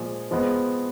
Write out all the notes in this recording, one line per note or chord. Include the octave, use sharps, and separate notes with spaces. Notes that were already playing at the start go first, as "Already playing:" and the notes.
Already playing: A#2 F3 G#3
F3 G#3 B3